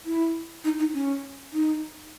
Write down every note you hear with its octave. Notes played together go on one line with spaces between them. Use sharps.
E4
D#4
D#4
C#4
D#4